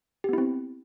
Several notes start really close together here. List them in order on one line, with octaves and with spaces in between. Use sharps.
G4 B3 E4 C4